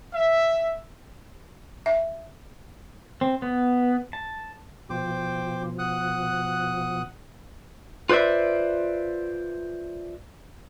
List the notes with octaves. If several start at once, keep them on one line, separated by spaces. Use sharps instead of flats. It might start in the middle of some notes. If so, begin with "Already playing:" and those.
E5
E5
C4
B3
A5
B2 F3 C5 G5 D6
F#5 D#6 F#6
F4 B4 C5 D5 E5